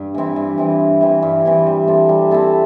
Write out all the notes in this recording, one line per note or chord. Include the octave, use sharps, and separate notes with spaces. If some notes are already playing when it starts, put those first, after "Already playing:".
Already playing: G2
E3 C4 E4
G2
E3 C4 E4
G2
E3 C4 E4
G2
E3 C4 E4
G3
C4 E4 A4
G3
C4 E4 A4